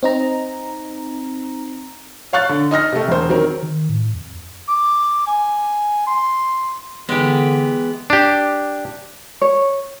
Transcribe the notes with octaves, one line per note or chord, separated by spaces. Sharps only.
C4 D#4 A#5
C#5 F5 C#6 F#6 A6
D3
D#4 D#5 F6 A#6
C3 A3
E1 C5
D#3 F#3 C4 A#4
D#3
A2
F2
D6
G#5
C6
D3 E3 G#3 B3 G4
D4 G4
C#5